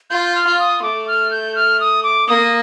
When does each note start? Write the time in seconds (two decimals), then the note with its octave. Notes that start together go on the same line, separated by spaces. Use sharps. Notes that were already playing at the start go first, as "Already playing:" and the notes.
0.10 F4 G6
0.35 F6
0.47 F4
0.59 D#6
0.83 A3 D6
1.08 F6
1.31 G6
1.55 F6
1.80 D#6
2.03 D6
2.28 A#3 D#6